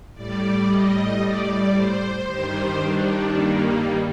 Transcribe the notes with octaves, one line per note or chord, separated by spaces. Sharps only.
A2 G3 D5
D#5
D5
C5
G2 D#3 G3 C5
D4
A#3